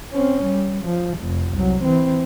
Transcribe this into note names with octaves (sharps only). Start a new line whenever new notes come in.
C4 C#4
G3
F3
F1
C2 F#3
E3 C4